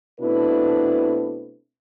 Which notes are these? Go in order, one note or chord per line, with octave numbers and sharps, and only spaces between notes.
B2 A3 C4 D4 E4 B4